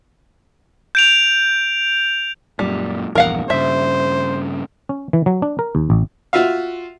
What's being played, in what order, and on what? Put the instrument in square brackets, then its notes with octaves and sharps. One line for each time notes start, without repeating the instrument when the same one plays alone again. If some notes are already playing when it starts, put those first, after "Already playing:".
[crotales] G6 D7 F7
[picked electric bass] F#2 A#2 [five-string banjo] G3
[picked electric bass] A#1 E2 G2 [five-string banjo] A#4 F5 F#5
[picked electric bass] G2 C#3 [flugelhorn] C5 [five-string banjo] E5
[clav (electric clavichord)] C#4
E3
F#3
D4
A#4
D#2
A1
[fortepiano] F4 F#4 E5 F5